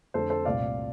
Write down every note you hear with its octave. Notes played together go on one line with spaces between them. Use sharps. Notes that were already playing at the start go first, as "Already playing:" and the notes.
F2 D3 A3 A4 C5
A4 C5
C2 A#2 A3 D5 F5